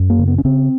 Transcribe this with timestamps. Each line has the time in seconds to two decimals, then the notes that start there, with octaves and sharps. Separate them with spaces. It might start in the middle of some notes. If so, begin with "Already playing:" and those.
Already playing: F#2
0.10 A#3
0.19 C#3
0.28 B3
0.38 C#4
0.45 C#3 C4